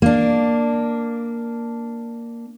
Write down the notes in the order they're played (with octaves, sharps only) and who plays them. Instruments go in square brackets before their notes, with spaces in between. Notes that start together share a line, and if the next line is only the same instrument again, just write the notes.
[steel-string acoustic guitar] A#3 D4